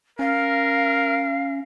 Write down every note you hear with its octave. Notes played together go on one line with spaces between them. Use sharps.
C#4 A#4 F5